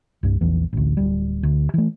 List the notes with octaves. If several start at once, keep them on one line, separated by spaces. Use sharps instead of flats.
C2 G2
A#1 E2 E3
A1 D2
D1 G3
D2
E3 A3